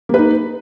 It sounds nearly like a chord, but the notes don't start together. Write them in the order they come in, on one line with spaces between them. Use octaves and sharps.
A#3 B4 D#4